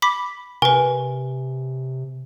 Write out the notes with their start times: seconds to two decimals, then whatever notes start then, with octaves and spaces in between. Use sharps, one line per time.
0.02 B5 D6 B6
0.62 C3 A#4 B4 G#5